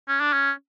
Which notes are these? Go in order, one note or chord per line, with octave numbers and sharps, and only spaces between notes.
C#4
D4
C#4